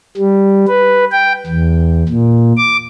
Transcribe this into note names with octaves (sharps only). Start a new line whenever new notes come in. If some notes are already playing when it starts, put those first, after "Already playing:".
G3
B4
G5
E2
A#2
D6